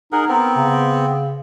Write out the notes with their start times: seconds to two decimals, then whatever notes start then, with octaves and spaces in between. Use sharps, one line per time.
0.12 D#4 G#4 A#4 F#5
0.28 B3 C4 A#4
0.55 C#3